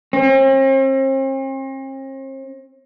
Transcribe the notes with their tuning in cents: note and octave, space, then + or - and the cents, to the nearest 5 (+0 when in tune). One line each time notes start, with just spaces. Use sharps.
C4 +45